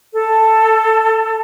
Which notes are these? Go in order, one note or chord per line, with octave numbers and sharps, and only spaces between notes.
A4